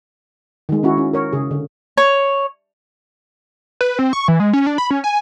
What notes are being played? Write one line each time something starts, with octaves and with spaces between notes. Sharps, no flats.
D#3 G#3
C#4 E4 F#4
C#4
A#4 C#5
C#3 G#4
D3
C#5
B4
C4
C#6
E3
G#3
C#4
D4
B5
C#4
G#5